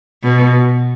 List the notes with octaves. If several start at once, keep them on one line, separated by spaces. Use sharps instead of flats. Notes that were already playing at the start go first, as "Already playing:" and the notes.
B2